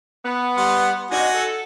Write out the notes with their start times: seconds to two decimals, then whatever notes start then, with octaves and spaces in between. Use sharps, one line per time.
0.25 B3
0.57 G3 F#5 C6
1.11 C3 D4 D#4 F#4 F#5 G#5
1.34 A4